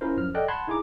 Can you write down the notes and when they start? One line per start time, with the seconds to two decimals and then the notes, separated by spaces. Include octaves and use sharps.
0.01 C#4 E4 F4 A#4 C5
0.17 F#2 F3 F6
0.34 A4 D5 D#5 F#5 G5 F#6
0.48 F#5 A5 B5 C6 F#6 G#6
0.67 D#4 E4 G#4 G#5 A#5 D6